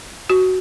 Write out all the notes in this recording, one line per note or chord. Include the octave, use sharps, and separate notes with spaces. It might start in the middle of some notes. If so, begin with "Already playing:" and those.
F#4